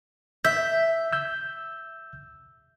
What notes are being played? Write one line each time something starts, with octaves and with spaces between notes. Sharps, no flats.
E5 G6
E6 G6